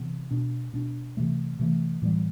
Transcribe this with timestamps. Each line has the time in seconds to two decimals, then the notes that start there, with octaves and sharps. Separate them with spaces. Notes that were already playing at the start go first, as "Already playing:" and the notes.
Already playing: C3 E3 B3
0.31 B2 B3 D4
0.73 B2 B3 D4
1.17 C3 E3 A3
1.59 C3 E3 A3
2.02 A2 E3 G3 B3